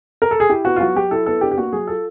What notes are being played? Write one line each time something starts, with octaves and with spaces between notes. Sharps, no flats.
A#4
A4
G#4
E4 G4
B3 F#4
F4
F#3 F#4
F#3 G4
E4 A4
B3 A4
D4 G4
G4
A#3 F#4
F#3 G#4
F4 A4